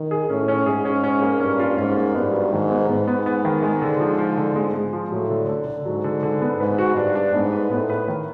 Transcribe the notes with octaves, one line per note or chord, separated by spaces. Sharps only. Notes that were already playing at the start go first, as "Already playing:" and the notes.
Already playing: D#3
G#4
A2 C#4
C#4
G#2 G#4
C#4
C#4
A#3
G2 C#4
F4
G#2 C#4
A#3
G2 B3
F#3
G#2 D#3
B3
G#2 B3
B3
B3
D#3
G#3
D3
F3
F3
D3
G#3
G#3
F3
A2 F#3
D3
D3
D3
G#2 F#3
D3
D3
B3
G#2 B4
F#4
G2 D4
D4
G#2 B3
B4
A2 B3
B4
D#3